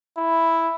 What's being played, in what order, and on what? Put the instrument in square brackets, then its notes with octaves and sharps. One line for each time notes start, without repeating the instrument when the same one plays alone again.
[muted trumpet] E4